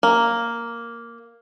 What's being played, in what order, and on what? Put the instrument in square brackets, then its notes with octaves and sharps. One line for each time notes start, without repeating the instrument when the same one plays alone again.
[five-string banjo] A#3